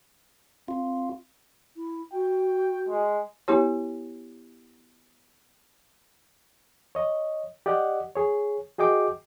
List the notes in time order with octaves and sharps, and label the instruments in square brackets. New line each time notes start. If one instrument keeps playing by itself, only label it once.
[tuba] C4 [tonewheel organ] F4
[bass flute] E4
[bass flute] F#4 [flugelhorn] G5
[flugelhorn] G#3
[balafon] B3 E4 G4 C#5
[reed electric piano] C#5 D#5
G4 D5 D#5 F#5
G#4 C#5
F#4 G#4 D#5 G5 D6